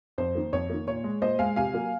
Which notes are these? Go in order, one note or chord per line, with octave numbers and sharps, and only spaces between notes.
F2 C5
D#3 A#3
F2 C#5
D#3 A#3
A#2 C#5
G#3
A#2 C5 D#5
G#3 F5 G#5
C3 F5 G#5
F#3 A#3